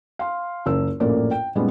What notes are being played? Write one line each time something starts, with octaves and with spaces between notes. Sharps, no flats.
F5 C6
F#1 C#2 A#4 E6
A#1 F#2 A2 A#3 A#4 D5
G5
F#2 A#2 G3 G#3 B3 D#4